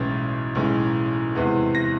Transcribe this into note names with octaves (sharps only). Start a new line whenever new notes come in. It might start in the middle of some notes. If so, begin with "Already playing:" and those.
Already playing: B1 A2 E3 G#3 C#4 A6
B1 A2 E3 G#3 C#4
E2 C3 E3 G#3 B3
A#6